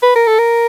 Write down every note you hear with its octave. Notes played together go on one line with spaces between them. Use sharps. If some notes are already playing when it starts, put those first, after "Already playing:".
B4
A#4
A4
A#4